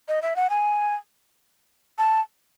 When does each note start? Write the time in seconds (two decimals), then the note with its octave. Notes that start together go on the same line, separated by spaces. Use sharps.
0.08 D#5
0.22 E5
0.36 F#5
0.50 G#5
1.98 A5